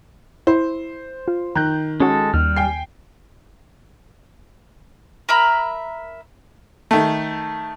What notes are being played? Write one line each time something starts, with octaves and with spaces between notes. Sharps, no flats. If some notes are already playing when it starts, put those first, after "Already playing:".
E4 C5
F4
D#3 A#5 F#6 G6
G#3 C#4 F#4 A4
D#2 G3 F6
G5 G#5 C7
A#4 E5 A#5 B5
D#3 A3